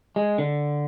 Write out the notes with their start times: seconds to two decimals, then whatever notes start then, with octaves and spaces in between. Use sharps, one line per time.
0.16 G#3
0.38 D3